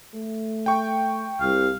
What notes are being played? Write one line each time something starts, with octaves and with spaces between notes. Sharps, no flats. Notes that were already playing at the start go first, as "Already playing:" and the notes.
A3
G5 C#6
C2 F5